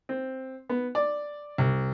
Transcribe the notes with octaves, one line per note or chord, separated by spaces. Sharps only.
C4
B3
D5
C2